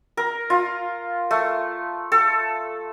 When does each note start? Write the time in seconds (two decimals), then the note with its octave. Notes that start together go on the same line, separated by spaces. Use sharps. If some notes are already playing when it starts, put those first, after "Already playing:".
0.17 A#4
0.50 F4
1.31 A3
2.12 A4